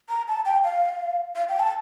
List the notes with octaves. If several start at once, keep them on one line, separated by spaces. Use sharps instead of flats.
A#5
A5
G5
F5
F5
G5
A5